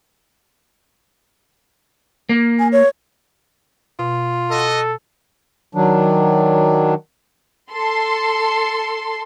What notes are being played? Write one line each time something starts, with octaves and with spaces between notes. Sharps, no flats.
A#3
G#5
C#5
B2 F4
F#4 A4 D#5
D#3 F#3 D4
A4 C6